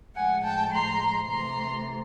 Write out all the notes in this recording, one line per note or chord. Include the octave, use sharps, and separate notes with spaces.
A2 F3 G#3 F#5 G#5
G5 A5
A#5 C6
C3 E3 A3 A#5 C6